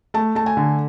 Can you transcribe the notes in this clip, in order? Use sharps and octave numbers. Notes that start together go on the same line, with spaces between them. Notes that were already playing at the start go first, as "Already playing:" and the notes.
A3 A5
A3 A5
G#5
D3